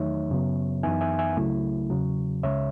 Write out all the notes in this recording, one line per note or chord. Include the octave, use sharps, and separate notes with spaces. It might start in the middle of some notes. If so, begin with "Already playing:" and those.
Already playing: E2 D#3 F#3 A3 D#4 C#5 E5
F#2 C#3 F#3 B3
F#2 E3 B3 D#4 E5 G#5
E5 G#5
E5 G#5
C#2 C#3 F#3 A3 E4
E2 C#3 F#3
C#2 C#3 G#3 C#5 E5